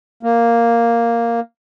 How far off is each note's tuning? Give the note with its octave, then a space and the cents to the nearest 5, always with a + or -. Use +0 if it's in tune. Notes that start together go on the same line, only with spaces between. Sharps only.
A#3 +0